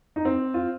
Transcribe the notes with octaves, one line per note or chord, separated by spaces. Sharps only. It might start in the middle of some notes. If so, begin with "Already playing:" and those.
D#4
C4
F4